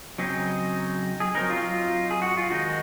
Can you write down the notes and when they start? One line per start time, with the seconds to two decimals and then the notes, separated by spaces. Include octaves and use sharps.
0.18 C#3 F#3 C4 D#4 G#4
1.20 G#4
1.35 F#3 C4 D#4 A#4
1.50 F4
1.63 F4
2.11 G#4
2.22 F#4
2.37 F4
2.50 D#3 G#3 D#4 F#4